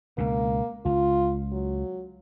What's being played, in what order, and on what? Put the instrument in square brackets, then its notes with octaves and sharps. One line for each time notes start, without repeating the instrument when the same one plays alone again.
[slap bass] C#2 B2 [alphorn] A#3
[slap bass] C#2 [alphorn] F4
[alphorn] F#3